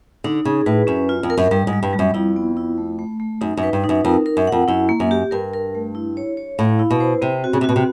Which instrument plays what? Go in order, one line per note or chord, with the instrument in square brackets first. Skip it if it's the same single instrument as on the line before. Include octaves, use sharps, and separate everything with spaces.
[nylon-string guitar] D3 [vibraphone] D#4
[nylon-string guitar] C#3 [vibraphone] G#4
[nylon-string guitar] A2 [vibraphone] B4
[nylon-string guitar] F#2 [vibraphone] C#4
[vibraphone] F4
[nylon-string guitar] F2
[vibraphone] A#4
[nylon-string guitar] F#2
[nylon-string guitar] G2 [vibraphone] G3
[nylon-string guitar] G#2
[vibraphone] G3
[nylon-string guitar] G2
[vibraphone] G3
[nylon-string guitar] F#2
[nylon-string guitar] F2 [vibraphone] E4
[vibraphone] B3
E4
A3
A3
A3
[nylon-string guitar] F#2 [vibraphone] D#4
[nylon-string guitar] F#2
[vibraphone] B4
[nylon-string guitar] G2
[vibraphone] D#4
[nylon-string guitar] F#2
[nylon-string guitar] F2 [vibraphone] A#4
[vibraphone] A#4
[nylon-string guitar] F#2
[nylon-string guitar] F2 [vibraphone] F#5
[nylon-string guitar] F#2 [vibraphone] E4
[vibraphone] A#3
[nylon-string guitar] F#2
[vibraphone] G4
[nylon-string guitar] G2 [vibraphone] A#4
[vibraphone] A#4
A3
E4
C#5
C#5
[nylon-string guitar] A2 [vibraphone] F5
[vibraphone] E4
[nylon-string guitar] B2
[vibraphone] C5
[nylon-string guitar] C3 [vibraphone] C4
[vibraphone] F#4
[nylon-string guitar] C#3
C3
[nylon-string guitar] B2 [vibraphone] F#4
[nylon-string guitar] C3